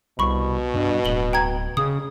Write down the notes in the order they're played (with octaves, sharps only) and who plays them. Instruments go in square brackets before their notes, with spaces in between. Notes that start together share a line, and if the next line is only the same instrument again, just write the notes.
[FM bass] C2 [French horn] B2 [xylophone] B5 C#6
[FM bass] G2
[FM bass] D1 [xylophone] F#7 G7
[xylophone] G5 A#5 G#6
[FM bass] C#3 [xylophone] D#6